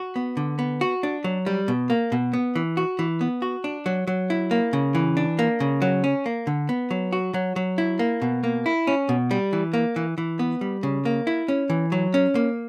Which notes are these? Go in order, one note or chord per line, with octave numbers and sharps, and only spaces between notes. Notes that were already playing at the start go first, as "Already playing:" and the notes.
Already playing: F#4
B3
D3
B3
F#4
D4
F#3
G3
B2
A#3
B2
B3
E3
F#4
E3
B3
F#4
D4
F#3
F#3
E4
A#3
C#3
E3
D4
A#3
C#3
F#3
C#4
A#3
D3
B3
F#3
F#4
F#3
F#3
E4
A#3
B2
A#3
E4
C#4
B2
G3
E3
A#3
E3
E3
B3
G3
C#3
A#3
E4
C#4
E3
F#3
C#4
A#3